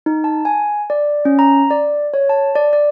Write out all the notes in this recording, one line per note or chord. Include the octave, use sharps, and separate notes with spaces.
D#4
A5
G#5
D5
C#4
A#5
D5
C#5
A5
D5
D5